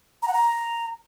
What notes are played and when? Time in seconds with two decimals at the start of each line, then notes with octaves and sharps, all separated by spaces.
0.22 A#5
0.28 F#5
0.33 A#5